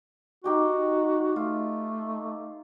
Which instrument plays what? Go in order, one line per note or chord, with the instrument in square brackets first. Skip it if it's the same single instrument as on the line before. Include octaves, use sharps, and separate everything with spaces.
[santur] D#4 G4 G5 [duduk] F#4
[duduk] A3 [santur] F4